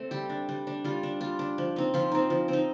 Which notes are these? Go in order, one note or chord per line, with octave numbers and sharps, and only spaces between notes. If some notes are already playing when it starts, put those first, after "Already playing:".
Already playing: A3 C4
G3 G4
D4
G3
D4
G3 F4
D4
G3 F4
D4
F3
C4 D#4
F3 F4
C4 D#4
F3
C4 D#4